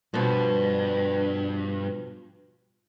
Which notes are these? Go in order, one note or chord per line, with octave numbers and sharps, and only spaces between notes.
G2 B2 F3